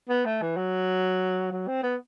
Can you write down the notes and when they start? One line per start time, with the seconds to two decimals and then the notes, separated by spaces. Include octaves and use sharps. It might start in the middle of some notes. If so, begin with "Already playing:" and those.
0.09 B3
0.25 A3
0.42 E3
0.57 F#3
1.52 F#3
1.68 C4
1.83 B3